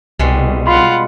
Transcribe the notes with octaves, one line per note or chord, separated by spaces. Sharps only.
C2 B2 G3 G#3
F4 F#5 B5 C6